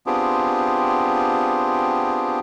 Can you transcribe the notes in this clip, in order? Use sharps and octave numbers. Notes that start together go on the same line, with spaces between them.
B3 C4 D4 F4 G4 G#4